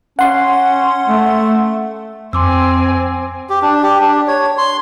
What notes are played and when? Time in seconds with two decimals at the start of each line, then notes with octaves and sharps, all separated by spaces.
0.19 C#4 F#5 C6
1.08 A3
2.33 F2 C4 G#5 C6 D6 E6
3.50 G4
3.62 D4
3.83 G4
4.00 D4
4.28 C#5
4.58 C6